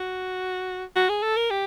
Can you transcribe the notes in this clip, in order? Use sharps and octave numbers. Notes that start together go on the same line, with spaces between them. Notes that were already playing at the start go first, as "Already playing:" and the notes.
Already playing: F#4
F#4
G#4
A4
A#4
G4